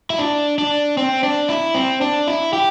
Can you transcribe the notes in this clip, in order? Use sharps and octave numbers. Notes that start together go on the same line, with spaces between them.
E4
D4
D4
C4
D4
E4
C4
D4
E4
G4